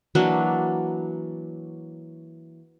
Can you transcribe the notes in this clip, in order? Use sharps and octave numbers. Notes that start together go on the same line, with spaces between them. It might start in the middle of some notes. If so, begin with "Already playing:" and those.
E3 F#3 A#3 D4